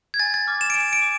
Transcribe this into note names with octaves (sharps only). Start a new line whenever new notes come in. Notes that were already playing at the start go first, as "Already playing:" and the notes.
G#6
G#5 A6
A6
D6 F6
E7
D7
G#5 E7
D7
D6